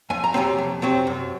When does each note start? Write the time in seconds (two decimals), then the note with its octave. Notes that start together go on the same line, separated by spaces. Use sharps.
0.10 F2 G#5
0.24 A#5
0.34 C3 F#3 C4 G#5
0.58 F2
0.82 C3 F#3 C4
1.07 F#2